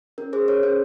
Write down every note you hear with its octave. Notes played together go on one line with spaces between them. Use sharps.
C#4 A#4
G#4 C5
G#4 A#4 C#5
C#4 C5